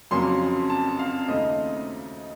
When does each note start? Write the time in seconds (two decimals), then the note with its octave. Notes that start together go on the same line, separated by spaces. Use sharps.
0.11 F2 C#3 F#3 A#3 C#4 C6
0.70 A5
0.99 F5
1.28 D#2 C#3 A3 C4 D#4 D#5